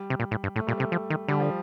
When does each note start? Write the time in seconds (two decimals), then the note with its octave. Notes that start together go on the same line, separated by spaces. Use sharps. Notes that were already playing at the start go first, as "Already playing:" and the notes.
Already playing: G3
0.10 C3
0.20 A#2
0.31 A2
0.44 G2
0.56 A2 A3
0.67 A#2 G3
0.77 C3 A3
0.92 F3
1.10 D#3
1.28 D3 G3
1.40 F3